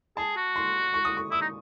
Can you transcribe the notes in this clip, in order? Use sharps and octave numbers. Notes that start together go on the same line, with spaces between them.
G#4 A5
F#4
C6
C#6
D#6
C#6
E4 D#6
D#4